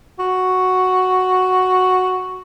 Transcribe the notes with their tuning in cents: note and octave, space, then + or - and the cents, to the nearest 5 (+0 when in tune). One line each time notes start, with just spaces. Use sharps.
F#4 +0